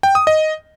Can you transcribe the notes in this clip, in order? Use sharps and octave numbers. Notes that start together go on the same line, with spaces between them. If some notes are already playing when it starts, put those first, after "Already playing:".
G5
D#6
D#5